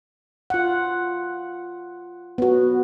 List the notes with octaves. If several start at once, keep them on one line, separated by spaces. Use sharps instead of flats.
F4 F#5
B3 F#4